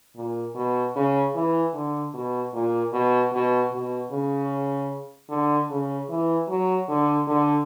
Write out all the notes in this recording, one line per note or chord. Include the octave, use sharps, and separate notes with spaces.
A#2
B2
C#3
E3
D3
B2
A#2
B2
B2
B2
C#3
D3
C#3
E3
F#3
D3
D3